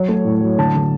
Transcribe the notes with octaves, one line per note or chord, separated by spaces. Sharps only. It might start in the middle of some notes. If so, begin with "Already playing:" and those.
Already playing: F#3 C#5
A3
A2
F#3
D3 A5
D3